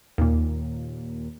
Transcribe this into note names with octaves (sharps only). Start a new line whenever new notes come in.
D#2 A#2